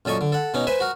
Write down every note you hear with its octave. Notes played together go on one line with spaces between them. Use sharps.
F#2 A#2 A4 D#5 C#6
D3
A4 F#5
B2 C#4 D#4
B4 C5 E5 G#5
F#4 A#4